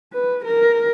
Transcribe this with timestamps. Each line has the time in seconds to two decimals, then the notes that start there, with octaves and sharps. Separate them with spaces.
0.13 B4
0.45 A#4